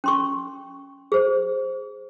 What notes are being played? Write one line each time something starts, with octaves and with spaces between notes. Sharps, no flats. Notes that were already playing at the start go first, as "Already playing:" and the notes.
C#4 C6 C#6
G#4 C5